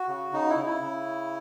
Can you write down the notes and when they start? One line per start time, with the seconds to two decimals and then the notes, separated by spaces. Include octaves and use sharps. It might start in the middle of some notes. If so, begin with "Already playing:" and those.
Already playing: F#4
0.08 C#3
0.32 C#3 D#4
0.50 E4
0.58 C#3
0.66 E4
0.82 C#3